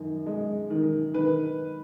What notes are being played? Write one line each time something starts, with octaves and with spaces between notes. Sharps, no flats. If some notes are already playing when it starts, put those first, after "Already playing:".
Already playing: F#2 D#3
G#3
D#3
D#3 B4